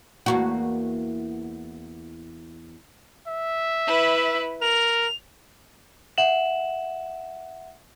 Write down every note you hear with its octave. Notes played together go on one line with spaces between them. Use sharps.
E2 A#3 F#4
E5
E4 B4
A#4 F7
E5 F#5 E7 F#7